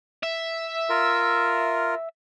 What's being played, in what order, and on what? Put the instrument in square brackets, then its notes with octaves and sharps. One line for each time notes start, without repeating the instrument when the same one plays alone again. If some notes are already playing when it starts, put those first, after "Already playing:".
[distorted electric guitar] E5
[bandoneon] F4 A#4